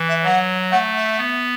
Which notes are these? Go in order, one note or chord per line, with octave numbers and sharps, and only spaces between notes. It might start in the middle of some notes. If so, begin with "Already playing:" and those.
Already playing: E3
E5
F#3 F#5
A3 F#5
E5
B3